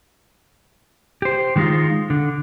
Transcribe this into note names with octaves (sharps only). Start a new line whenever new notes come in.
G4 C5
D#3 G#3 B3 D#4 F4
D3